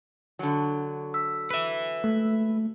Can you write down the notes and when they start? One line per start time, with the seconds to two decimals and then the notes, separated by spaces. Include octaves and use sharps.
0.39 D3 F#3
1.14 E6 B6
1.51 B4 E5
2.04 A3